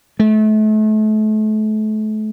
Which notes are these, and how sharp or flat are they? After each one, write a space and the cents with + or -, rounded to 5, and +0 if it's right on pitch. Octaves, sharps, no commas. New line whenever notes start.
A3 -35